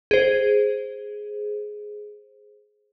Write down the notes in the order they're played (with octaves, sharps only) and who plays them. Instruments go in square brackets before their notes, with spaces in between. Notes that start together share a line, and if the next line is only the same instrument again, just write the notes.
[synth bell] G#4 C5